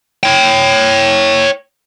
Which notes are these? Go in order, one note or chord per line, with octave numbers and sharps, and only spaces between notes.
C#5 G5